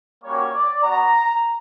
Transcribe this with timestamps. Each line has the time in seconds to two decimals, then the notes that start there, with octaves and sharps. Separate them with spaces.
0.22 G3 A#3 C#4 F#4 C#5
0.52 D5
0.82 B3 F#4 A#5